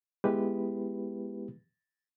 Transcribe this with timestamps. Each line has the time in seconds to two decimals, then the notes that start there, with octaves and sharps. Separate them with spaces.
0.24 G#3 B3 E4 G4 B4